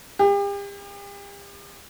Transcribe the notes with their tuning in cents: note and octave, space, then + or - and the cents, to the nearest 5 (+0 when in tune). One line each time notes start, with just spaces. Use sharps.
G4 +40